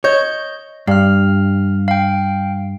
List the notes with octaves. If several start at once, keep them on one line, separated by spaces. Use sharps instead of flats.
C#5 D#5 G6
G2 F5 F6
F5 G5